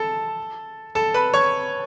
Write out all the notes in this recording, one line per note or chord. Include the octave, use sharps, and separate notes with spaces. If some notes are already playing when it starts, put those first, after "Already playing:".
Already playing: A4 A5
A4 A5
B4 B5
C#5 C#6